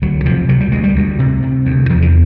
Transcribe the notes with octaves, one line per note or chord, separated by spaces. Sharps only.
D2 F#3
C3 F3
C3 F#3
G3
D2 G#3
G3
D2
C3
C3
D2
E2 F3
E3